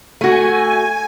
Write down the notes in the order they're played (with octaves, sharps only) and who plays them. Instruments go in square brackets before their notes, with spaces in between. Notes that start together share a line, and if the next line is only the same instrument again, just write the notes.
[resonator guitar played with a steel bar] A3 F#4 [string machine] G#5